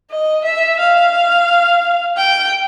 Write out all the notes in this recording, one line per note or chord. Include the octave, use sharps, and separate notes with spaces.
D#5
E5
F5
G5